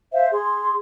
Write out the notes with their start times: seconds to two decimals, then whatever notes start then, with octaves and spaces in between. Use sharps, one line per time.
0.12 C5 E5 F5
0.32 G#4 C6